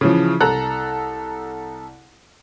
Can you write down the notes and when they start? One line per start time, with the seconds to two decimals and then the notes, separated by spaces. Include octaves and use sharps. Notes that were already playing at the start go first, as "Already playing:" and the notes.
0.01 C#3 E3 F3
0.41 C2 A4 A#5 F#6